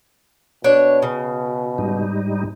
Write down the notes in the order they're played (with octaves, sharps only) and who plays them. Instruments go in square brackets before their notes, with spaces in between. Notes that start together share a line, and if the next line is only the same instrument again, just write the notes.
[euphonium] B2 [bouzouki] D4 C#5
[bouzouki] C#3
[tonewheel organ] G#2 G3 D#4